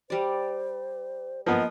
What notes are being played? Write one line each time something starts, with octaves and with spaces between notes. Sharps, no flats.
G3 C5 D5
F3 A#3 B3 D#5